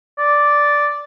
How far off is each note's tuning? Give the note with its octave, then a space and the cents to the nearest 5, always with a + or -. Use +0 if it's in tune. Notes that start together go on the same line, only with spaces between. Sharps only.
D5 -5